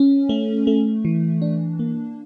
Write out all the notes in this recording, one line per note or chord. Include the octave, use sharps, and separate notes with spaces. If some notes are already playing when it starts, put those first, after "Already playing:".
Already playing: C#4
A3
A3
E3
D4
A#3